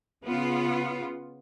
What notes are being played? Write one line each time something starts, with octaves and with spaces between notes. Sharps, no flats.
C#3 B3 F4